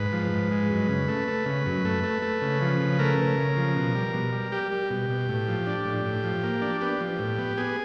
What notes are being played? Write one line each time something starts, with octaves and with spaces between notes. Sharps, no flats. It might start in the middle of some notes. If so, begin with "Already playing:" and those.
Already playing: G#2 B4
F3
G#2
G#3
F#2
C#3
A3
A3
C#3
F#2
A3
A3
A3
C#3
F3
C#3
A3 A#4
C#3
C#3
F3
B2
G3
B2
G3
G3 G4
G3
B2
B2
A2
F3
D4
A2
A2
F3
A#3
D4
B3 G4
F3
A2
B3
B3 G#4